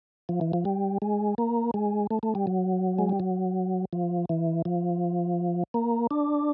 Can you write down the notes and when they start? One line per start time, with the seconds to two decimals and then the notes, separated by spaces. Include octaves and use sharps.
0.29 F3
0.41 E3
0.53 F3
0.65 G3
1.02 G#3
1.38 A#3
1.74 G#3
2.11 A3
2.23 A3
2.35 G3
2.47 F#3
2.98 G#3
3.09 G3
3.20 F#3
3.93 F3
4.29 E3
4.65 F3
5.74 A#3
6.11 D4